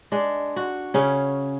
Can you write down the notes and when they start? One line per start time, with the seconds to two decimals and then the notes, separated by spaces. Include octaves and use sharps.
0.12 G#3 D4
0.56 F#4
0.94 C#3 C#4